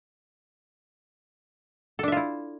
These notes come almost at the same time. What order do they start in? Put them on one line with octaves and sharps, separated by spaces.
A4 D4 E5 F4 E4